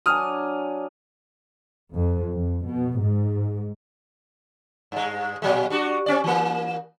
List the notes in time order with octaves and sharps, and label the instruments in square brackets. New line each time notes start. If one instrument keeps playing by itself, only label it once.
[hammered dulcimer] F#3 D4 G#5 [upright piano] D#6 F6
[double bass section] F2
F2
B2
G#2
[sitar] G2 G#3
A#2 F#3 G#3
G3 D4 F#4
C4 C#4 D5
E3 A#3